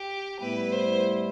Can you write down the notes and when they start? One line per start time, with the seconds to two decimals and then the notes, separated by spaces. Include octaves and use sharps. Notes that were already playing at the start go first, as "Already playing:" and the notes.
Already playing: G4
0.40 A2 G3 B3 E4 B4
0.72 C5